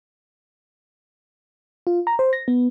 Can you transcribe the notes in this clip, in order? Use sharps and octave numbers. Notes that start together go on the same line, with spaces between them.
F4
A#5
C5
A#6
B3